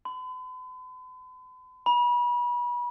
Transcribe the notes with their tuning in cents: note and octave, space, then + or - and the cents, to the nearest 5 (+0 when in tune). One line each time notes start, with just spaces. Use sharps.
B5 +45
B5 -30